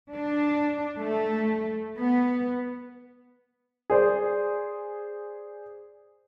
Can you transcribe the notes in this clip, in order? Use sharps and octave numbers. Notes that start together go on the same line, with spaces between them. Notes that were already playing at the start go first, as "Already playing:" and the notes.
D4
A3
B3
G#4 C5 D5